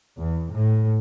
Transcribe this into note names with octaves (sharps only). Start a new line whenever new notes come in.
E2
A2